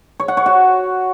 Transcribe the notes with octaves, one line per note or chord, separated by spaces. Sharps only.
C#5
F#5
C#5
F#4